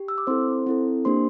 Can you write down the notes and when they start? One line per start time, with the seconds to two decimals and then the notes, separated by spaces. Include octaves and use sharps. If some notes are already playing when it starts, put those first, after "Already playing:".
Already playing: G4
0.08 E6
0.18 D6
0.27 C4 E4 A4 C5 C6
0.67 C4 E4 A4
1.05 A#3 D4 G4 C5 C6